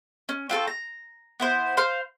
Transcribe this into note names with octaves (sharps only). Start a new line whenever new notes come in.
C#4
C4 F4 A4 C#6
A#5
B3 E4 C5
C5 F5 C6